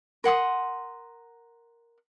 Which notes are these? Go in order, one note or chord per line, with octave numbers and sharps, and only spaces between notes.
A#4 F#5 C6 D#6